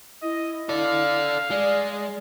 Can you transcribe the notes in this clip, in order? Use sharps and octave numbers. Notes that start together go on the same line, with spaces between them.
E4 D#5
A4 D5 F5
G#3 D5